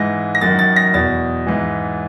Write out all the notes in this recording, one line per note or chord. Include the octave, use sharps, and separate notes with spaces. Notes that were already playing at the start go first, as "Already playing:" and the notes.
Already playing: G#2 E3 A#6
A#6
F#2 D#3 A6
A6
A#6
E2 B2 A6
G#2 E3